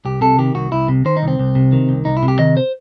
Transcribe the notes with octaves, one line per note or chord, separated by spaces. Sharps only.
C2 G4
C3 A4
D#3 G4
C2 F#4
C2 E4
C3
D#3 C5
D#4
C2
C4
C2
C3
D#3
C2
C2 D#4
E4
C3
G4
D#3 D#5
C5